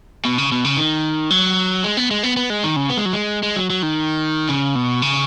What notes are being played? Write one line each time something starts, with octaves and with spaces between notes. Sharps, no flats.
B2
C#3
B2
C#3
D#3
F#3
G#3
B3
G#3
B3
B3
G#3
D#3
C#3
B3
G#3
F#3
G#3
G#3
F#3
F#3
D#3
C#3
B2
C#3